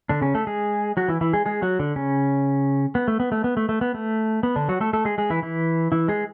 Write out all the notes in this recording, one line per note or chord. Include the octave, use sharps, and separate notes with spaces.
D3 D4
C#3 C#4
A3 A4
G#3 G#4
F#3 F#4
E3 E4
E3 E4
G#3 G#4
G#3 G#4
F#3 F#4
D3 D4
C#3 C#4
B3
A3
B3
A3
B3
A3
A3
B3
A3
B3
D3 D4
F#3 F#4
A3 A4
A3 A4
G#3 G#4
G#3 G#4
E3 E4
E3 E4
E3 E4
G#3 G#4